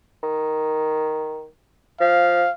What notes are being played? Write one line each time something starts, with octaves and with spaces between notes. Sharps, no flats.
D#3
F3 F5